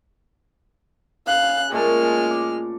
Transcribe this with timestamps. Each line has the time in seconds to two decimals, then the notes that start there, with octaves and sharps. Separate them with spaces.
1.27 C#3 F5 F#6
1.72 A#2 G#3 A3 A5 F6
2.31 D6